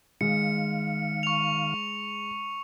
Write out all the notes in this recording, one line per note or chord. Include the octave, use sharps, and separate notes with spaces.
D#3 G#3 F5 C#7
C#6 F7